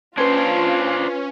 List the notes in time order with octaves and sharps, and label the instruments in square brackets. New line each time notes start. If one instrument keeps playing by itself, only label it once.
[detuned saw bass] C#4 [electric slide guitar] D4 C5 [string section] F4 [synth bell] B4 G#6